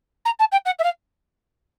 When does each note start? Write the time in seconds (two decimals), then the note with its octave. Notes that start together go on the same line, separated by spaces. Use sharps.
0.25 A#5
0.39 A5
0.51 G5
0.65 F#5
0.79 E5
0.83 F5